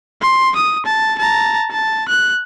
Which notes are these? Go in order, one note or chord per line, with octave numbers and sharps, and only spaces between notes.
C6
D#6
A5
A5 A#5
A5
F#6